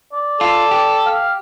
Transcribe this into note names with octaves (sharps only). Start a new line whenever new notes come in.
D5
F4 A4
G4
F5